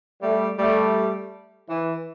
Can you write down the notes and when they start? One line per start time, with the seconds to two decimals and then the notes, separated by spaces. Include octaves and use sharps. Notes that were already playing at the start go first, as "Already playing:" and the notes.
0.21 G3 A3
0.58 G3 A3
1.69 E3